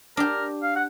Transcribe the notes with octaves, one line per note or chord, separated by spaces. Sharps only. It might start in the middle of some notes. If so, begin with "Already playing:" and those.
D4 G4 A#4
F5
F#5